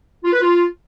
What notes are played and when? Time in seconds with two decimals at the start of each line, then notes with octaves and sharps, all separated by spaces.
0.24 F4
0.33 B4
0.41 F4